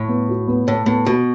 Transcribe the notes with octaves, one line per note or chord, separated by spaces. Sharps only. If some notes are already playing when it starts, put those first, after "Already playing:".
Already playing: A2
B3
F#4
B3
A2 C#5
A2 B3
B2 F#4